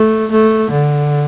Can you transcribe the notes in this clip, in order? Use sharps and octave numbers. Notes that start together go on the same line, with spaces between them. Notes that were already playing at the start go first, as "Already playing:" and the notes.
Already playing: A3
A3
D3